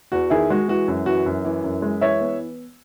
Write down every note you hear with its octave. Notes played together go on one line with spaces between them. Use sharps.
E2 F#4
D#3 E4 G#4
G#3 F#4
E3 F#4
F#2
E3 F#4
F#2
E3
F#2
G#3
E3 C#5 E5
B3